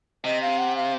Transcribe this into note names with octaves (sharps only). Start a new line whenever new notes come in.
C3 D#5
F5
F#5
F5